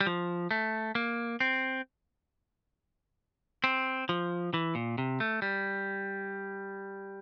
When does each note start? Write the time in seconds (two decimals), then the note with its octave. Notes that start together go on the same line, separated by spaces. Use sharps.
0.01 G3
0.07 F3
0.51 A3
0.95 A#3
1.40 C4
3.64 C4
4.09 F3
4.54 E3
4.75 A#2
4.98 C3
5.20 A3
5.42 G3